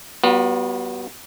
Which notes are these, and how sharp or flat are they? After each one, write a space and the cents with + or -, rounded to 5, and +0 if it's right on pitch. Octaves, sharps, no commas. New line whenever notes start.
G3 -45 B3 -15 F4 +45